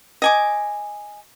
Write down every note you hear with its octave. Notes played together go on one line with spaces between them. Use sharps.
D#5 G#5 D6